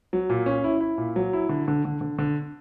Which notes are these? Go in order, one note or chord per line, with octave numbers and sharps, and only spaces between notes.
F#3
A#2
C#4
E4
E4
A#2
F#3
E4
D3
D3
D3
D3
D3